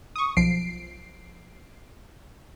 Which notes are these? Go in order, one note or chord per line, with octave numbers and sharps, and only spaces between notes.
C#6 D#6
B1 F3 C7 D7